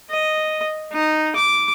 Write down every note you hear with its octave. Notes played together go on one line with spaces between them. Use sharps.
D#5
D#4
D6